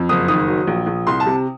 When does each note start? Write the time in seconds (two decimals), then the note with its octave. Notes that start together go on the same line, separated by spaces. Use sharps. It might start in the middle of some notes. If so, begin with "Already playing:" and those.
Already playing: F2
0.09 F#1 D#6
0.28 D#3 D#6
0.47 F#3
0.67 A#1
0.87 A#1
1.07 C2 C6
1.20 A5
1.26 C3